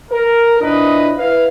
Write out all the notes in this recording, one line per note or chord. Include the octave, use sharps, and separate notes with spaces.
A#4
A#2 F3 D4 E4 B4 D#5
E4 B4 F5